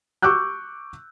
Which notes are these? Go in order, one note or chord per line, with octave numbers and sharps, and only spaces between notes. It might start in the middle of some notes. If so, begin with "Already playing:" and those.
C#6 D6 E6 F#6 G6